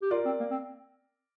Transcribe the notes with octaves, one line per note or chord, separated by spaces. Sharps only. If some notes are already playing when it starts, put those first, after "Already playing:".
G4
F4 A#4 D5
C4
A#3
C4